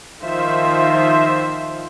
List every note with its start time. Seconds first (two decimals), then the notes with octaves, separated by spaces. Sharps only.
0.24 D#3 F3 F4 C5 E5